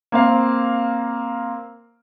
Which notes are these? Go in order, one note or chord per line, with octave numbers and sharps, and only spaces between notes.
A#3 C4 F5